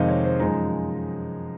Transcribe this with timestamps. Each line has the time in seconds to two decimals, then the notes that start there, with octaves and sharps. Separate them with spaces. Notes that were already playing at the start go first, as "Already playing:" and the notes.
Already playing: F2 C3 D#3 G#3 D#4 D#5 F5
0.08 C#5
0.25 C5
0.39 F#2 F3 G#3 D#4 A#5